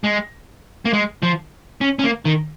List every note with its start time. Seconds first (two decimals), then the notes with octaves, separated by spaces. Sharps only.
0.04 G#3
0.85 A#3
0.93 G#3
1.23 F3
1.81 C#4
1.99 C#4
2.04 A#3
2.25 D#3